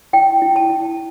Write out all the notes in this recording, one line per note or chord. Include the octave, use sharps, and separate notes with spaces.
E4 G5
E4
A5
E4